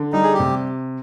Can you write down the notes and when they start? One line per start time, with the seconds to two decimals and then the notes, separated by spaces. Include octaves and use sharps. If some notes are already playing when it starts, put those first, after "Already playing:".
Already playing: D3
0.13 G3 D#4
0.23 G#4
0.33 G4
0.40 C3